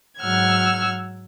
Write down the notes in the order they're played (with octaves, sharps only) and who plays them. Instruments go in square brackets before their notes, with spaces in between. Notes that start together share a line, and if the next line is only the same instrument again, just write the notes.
[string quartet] G#2 F#3 F#5 E6 F6 G#6